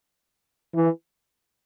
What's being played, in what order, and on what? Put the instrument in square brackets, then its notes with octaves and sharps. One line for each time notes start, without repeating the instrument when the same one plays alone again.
[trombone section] E3